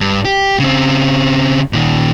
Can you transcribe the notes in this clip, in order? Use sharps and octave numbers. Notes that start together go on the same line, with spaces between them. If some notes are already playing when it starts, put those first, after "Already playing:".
G2
G4
C#3 C4
A#2 D#3